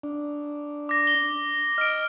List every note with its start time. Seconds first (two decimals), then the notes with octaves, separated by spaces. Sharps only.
0.03 D4
0.89 D6 A#6
1.07 G7
1.78 D#5 F6 D7